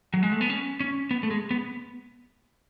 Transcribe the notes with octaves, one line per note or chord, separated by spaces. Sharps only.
F#3
G#3
A3
B3
C#4
C#4
B3
A3
G#3
B3